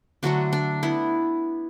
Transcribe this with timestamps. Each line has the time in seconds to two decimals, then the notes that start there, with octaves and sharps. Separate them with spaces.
0.23 D3 F#3 A3 D4 F#4
0.53 D4
0.83 B3 E4